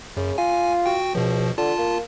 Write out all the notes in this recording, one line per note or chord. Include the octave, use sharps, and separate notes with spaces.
F#2 C#3
F4 G#5
F#4 G5
C#2 B2 F3
D3 F4 A5
A#3